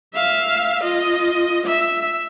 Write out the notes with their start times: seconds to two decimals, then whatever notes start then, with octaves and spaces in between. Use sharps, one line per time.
0.14 E5 F5
0.84 F4 D#5
1.66 E5